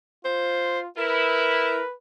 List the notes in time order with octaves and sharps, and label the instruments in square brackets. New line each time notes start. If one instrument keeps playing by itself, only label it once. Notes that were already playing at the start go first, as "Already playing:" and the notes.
[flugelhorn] F4 [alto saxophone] C5
[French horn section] E4 [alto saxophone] A#4 [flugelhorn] B4